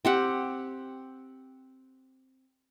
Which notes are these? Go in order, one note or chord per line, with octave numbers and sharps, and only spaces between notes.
C4 G4 F#5